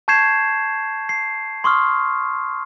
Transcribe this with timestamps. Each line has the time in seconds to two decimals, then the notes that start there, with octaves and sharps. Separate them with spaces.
0.08 A5 C#6 G6 G#6 C7 E7
1.09 C7
1.64 C6 C#6 D#6 F6